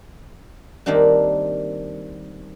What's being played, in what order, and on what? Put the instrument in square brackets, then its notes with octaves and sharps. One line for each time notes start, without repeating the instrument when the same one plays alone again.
[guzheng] D#3 G3 A#3 C4 D4